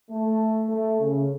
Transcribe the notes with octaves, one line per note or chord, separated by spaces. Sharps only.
A3
A3
C#3